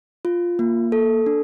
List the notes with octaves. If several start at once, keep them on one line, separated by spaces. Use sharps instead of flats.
F4
A#3
A4
D4